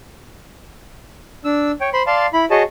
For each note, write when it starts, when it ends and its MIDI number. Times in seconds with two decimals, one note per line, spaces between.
1.45 1.72 62
1.45 1.72 88
1.81 1.90 73
1.81 1.90 79
1.93 2.02 72
1.93 2.02 83
1.93 2.02 84
2.07 2.26 74
2.07 2.26 77
2.07 2.26 81
2.07 2.26 84
2.33 2.45 64
2.33 2.45 83
2.51 2.63 66
2.51 2.63 68
2.51 2.63 73
2.51 2.63 75
2.51 2.63 81